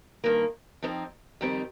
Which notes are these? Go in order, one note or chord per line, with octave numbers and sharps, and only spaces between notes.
G2 D#3 A#3
F2 F3 C4 D#4
F2 D#3 G3 C4 D#4